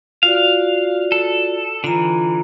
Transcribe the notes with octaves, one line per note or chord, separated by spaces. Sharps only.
F4 F#4 D5 F5
A4
D3 E3 F4 A#5